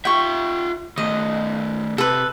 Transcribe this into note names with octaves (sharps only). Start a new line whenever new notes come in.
F4 E5 G5 C#6
D#3 A3 D#5
C3 A4 B4